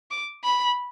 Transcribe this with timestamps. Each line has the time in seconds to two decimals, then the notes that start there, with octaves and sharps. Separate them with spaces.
0.11 D6
0.44 B5